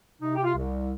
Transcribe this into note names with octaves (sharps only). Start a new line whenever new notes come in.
C3 D#4
G4
F4
C2